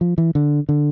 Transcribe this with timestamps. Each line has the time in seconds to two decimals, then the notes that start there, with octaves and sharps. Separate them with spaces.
0.01 F3
0.18 E3
0.35 D3
0.69 D3